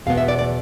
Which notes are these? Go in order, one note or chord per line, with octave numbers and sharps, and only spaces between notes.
E2 B2 B3 F5
E5
D5
D5